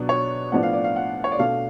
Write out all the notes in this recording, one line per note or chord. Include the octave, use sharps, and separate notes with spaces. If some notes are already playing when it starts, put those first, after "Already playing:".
Already playing: B2 F#3 B3 D4
C#5
A2 F3 B3 D4 F#5
F5
D5
F5
F#5
C#5
D5
B2 A3 D4 F5